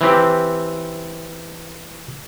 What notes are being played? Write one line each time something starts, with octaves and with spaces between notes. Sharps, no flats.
E3 C4 G4